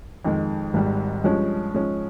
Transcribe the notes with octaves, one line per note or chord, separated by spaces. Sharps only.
F2 D#3 G#3
G#1 G#2 G3
G2 F3 G#3 C#4
G#2 F3 G#3 C#4